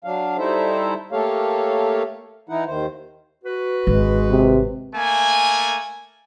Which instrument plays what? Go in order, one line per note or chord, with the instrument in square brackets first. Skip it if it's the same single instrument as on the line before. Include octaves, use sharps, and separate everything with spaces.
[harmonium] F#3 D4 F5
G3 D#4 E4 A4 C5 E5
A3 A#3 G4 A4 C#5 F5
E3 D#4 E4 F#5
D#2 D#3 C5
[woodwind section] F#4 B4
[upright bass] G#1 [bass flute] G#3
[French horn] C3
[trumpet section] A3 A#3 G#5